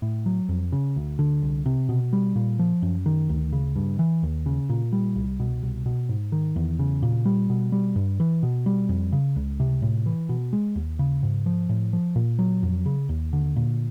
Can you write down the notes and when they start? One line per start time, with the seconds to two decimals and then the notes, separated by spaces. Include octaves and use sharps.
0.02 A2
0.26 F#3
0.49 F2
0.72 C#3
0.96 D2
1.19 D3
1.42 C2
1.66 C3
1.89 B2
2.13 G3
2.36 A#2
2.59 F3
2.82 F#2
3.06 D#3
3.29 D2
3.52 C#3
3.76 G2
3.99 E3
4.23 D#2
4.46 C#3
4.70 A#2
4.92 G3
5.16 C2
5.40 B2
5.63 C2
5.86 B2
6.09 G#2
6.32 D#3
6.56 E2
6.79 C#3
7.03 A#2
7.26 G3
7.50 B2
7.72 G3
7.96 G2
8.20 E3
8.43 B2
8.66 G3
8.89 F2
9.12 C#3
9.36 C#2
9.60 C3
9.82 A2
10.06 E3
10.29 B2
10.53 G#3
10.76 D#2
10.99 C#3
11.23 G#2
11.46 F3
11.69 A2
11.93 F3
12.16 A#2
12.39 F#3
12.63 F2
12.86 C#3
13.09 D#2
13.33 D3
13.56 A#2